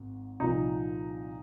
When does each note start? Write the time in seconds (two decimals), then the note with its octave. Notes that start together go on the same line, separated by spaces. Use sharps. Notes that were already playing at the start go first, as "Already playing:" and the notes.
Already playing: G#1 G#2
0.40 C2 A#2 F3 D#4